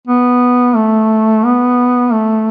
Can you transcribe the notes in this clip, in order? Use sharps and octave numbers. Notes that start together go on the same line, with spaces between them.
B3
A3
B3
A3